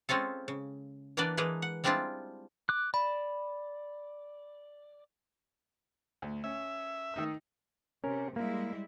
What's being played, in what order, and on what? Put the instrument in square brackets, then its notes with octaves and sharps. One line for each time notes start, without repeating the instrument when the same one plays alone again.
[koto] G#3 C4 C#4 F4 A4
C#3
E3 A#3 B3 D4 B4 D5
E3 G#3 A#3 G#4 B4
F#5
G3 G#3 C4 D4 E4 F4
[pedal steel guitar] D6 F#6
[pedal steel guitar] D5 [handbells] B5
[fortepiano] D2
[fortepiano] C#4 [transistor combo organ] E5
[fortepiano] D#3 D#4 E6
[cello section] C3 [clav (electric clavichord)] C#4 A#4
[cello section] G3 G#3 E4 [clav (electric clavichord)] A#3